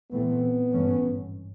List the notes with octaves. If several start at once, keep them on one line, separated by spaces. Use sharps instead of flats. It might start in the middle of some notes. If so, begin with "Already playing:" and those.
A#1 A2 E3 A3 B3 C4
G#1 G2 E3 A3 C#4